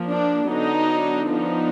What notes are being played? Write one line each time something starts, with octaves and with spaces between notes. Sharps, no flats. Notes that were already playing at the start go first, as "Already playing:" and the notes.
Already playing: F3 A#3
D4
D3 F#3 B3 D4 D#4
F3 B3 D4 D#4